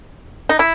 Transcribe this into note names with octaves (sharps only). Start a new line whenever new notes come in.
D#4
E4